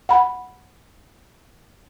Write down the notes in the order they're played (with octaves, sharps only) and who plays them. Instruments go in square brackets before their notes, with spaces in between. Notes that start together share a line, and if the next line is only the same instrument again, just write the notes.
[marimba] F#5 B5